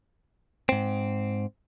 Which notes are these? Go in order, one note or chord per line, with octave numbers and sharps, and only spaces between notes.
G#2 C4